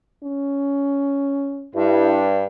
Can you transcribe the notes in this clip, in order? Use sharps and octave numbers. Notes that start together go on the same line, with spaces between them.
C#4
G2 E4